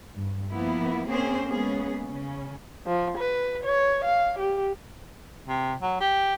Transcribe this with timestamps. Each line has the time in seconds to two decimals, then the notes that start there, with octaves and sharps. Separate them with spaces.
0.15 G2
0.52 F3 A#3 B3 E4
1.08 A#3 C4 C#4 G#4 C5
1.48 G#3 A#3 B3 C#4 G#4
2.04 C#3 C#4
2.86 F3
3.18 B4
3.64 C#5
4.05 F5
4.39 G4
5.48 C3
5.82 F#3
6.00 G4